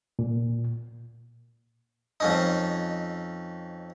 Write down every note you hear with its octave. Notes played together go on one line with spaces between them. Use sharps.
A#2
F2 C#4 D#4